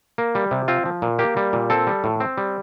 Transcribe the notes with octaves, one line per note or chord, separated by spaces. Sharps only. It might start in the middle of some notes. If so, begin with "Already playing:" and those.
A#3
G3
C3
C4 F4
F3
A#2
A#3 G4
G3
A#2
C4 A4
G3
A2
C4
G3